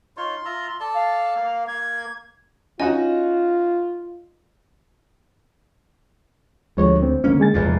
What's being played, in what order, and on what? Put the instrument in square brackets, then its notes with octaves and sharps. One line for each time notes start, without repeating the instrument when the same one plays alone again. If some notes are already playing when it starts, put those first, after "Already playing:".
[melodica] D#4 F4 C#5 [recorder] C6
[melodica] F4 E5 A#5
A4 D5 A5
[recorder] F5
[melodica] A#3
[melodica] A#3 [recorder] G#6
[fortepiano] C#4 D#4 F#4 [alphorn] F4 [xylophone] D#5 G#5
[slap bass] D2 [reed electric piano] F3 G#3 C#5
[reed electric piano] C4
[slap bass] D3 A#3 C#4
[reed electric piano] G#3 G#5 A6
[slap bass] F1 E2 A#2